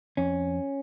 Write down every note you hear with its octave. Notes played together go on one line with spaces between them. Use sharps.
F2 C#4